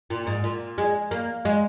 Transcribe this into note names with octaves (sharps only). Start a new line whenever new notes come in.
A#2
G#2
A#2
G#3
A#3
G#3